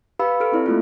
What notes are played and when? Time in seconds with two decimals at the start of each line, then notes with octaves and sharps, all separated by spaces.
0.19 G4 B4 F5 B5 E6
0.40 G4 A4 F6 D7
0.52 C4 E4 D5
0.66 A3 A#3 F4